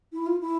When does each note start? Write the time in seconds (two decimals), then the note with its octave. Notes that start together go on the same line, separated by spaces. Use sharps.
0.13 E4
0.26 F4
0.40 E4